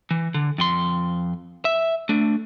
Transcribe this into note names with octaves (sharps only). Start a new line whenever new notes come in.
E3
D3
F2 C6
E5
A3 D4